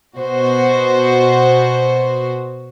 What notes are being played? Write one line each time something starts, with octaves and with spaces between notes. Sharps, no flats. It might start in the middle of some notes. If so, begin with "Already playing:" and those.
B2 F#4 C5